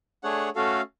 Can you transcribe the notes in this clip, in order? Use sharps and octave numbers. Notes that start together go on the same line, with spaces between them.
A3 D4 G#4 C#5 F#5
A3 C#4 F#4 A4 F5